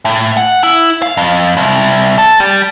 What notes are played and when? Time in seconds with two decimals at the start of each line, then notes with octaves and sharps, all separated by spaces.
0.05 A2
0.37 F#5
0.63 E4
1.02 F5
1.17 F2
1.57 C2
2.18 A4
2.40 G3